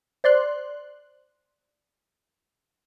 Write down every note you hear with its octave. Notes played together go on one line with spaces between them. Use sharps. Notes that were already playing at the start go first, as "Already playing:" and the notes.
C5 D5 C6 F#6